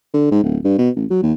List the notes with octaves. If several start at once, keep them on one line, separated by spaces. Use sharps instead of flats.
D3
G#2
D1
G2
B2
A1
F#3
D#2